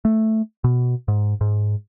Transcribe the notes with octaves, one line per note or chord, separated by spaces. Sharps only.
A3
B2
G#2
G#2